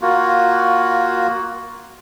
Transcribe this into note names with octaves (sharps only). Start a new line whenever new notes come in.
A#3 F4 F#4